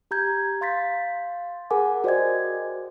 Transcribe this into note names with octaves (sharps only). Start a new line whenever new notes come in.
G4 A#5 G6 G#6
F5 C6 A6 B6
G#4 A#4 F#5 G#5 D6
F#4 C5 D5 D#5 G5 G#6